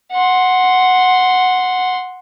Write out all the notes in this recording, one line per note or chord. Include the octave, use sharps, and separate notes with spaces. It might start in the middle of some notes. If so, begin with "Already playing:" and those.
F#5 C6